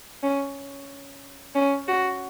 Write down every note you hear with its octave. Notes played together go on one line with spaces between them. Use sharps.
C#4
C#4
F#4